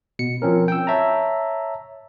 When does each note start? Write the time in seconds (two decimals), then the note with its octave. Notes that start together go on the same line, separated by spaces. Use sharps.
0.19 B2 C#7
0.42 F3 C4 C#4 A#4
0.68 G5 E6
0.87 C#5 E5 A5 A#5